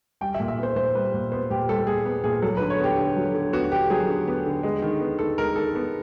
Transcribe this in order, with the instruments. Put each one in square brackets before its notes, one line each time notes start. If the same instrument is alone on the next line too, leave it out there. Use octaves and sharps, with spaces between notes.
[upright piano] G3 G5
E5
A#2
E5
B3 C5
A#2 C5
G3 B4
A#2
B3 C5
A#2 G4
G3 A4
A#2 G#4
B3
A#2 G#4
F#3 A4
B4
D3
C#5
B3 G4
D3
F#3
D3
B3 F#4
D3 G4
F#3 G#4
D3
B3
D3
G#3
D#3
B3
D#3 A4
G#3 A#4
D#3 A4
B3